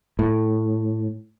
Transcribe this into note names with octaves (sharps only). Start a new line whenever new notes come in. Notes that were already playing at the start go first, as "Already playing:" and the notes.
A2